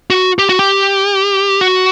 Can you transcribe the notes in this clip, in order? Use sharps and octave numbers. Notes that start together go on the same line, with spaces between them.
F#4
G4
F#4
G4
F#4